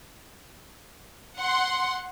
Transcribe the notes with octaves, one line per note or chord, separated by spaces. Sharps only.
F#5 C6